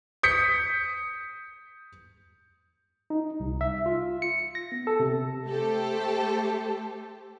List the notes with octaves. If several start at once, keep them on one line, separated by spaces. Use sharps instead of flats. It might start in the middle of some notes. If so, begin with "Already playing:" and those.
D#6 G6 B6 C#7
D#4
C2
E5
F4
C#7
A#6
B3
A4
C3
A3 G4 A4 C5